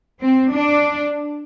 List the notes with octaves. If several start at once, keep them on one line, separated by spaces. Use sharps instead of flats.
C4
D4